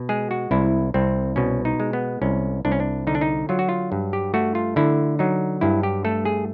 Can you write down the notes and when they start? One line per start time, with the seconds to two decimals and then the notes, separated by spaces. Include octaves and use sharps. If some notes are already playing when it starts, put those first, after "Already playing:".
Already playing: B2
0.09 G#3 G#4
0.31 F#4
0.51 C2 E4
0.94 C2 C4
1.36 B2 C#4
1.65 D#4
1.80 G#3
1.93 B3
2.22 C2 C#4
2.65 C2 D4
2.72 C#4
2.80 D4
3.07 D3 D#4
3.15 D4
3.21 D#4
3.49 F#3 F4
3.59 F#4
3.69 F4
3.92 G2
4.13 G4
4.34 A3 F#4
4.55 F4
4.76 D3 E4
5.19 F#3 D#4
5.61 G2 E4
5.83 G4
6.05 A3 A4
6.25 G#4